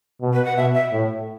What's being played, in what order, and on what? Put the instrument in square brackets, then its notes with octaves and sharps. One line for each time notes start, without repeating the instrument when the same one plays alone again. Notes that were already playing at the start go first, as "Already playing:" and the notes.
[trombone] B2
[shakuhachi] B4
F#5
[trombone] B2 [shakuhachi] E5
[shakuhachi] E5
[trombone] A2